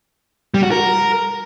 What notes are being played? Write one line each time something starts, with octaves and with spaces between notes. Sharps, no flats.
G3
F#4
A#4